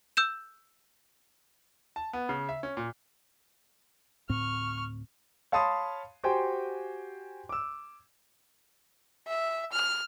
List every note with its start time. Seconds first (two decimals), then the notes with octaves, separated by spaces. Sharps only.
0.17 E6 G6 E7
1.96 A5
2.13 B3
2.29 C#3
2.49 E5
2.63 C#4
2.77 A#2
4.29 D2 A2 C4 C#6 F6
5.52 C#5 F5 A5 B5 C6 D#6
6.24 F#4 G4 C5 G5 G#5 C6
7.49 D6 E6
9.28 E5
9.72 F6